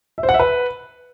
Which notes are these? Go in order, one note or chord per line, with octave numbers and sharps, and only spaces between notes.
E5
C5
F#5
E5
B4